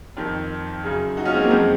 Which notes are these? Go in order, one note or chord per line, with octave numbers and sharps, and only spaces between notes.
F2 D#3
F#2 C#3
D#4 F#4
C#4 F4
G#3 C4
F#3 A#3
F2 D#3 G#3 C4